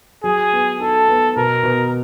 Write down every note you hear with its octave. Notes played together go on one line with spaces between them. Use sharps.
F#3 G#4
B3
D#4 A4
B3
B2 A#4
B2